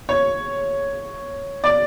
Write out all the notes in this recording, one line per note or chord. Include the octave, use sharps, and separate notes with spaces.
C#5
D5